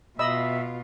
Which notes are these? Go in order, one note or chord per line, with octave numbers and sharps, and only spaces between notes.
B2 F4 D#5 E5 B5 E6